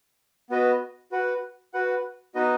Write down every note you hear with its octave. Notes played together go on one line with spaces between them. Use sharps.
B3 F#4 B4 D#5
F#4 B4 F#5
F#4 B4 F#5
B3 D#4 F#4 B4 D#5